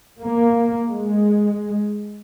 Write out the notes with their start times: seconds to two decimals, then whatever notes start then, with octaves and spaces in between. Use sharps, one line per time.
0.21 A#3
0.88 G#3